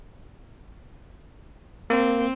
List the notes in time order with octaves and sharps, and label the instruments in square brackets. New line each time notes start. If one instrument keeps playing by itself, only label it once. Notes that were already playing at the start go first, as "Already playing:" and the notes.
[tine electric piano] A#3 [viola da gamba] C4